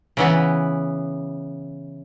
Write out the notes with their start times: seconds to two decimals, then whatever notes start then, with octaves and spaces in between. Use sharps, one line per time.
0.17 C#3 E3 B3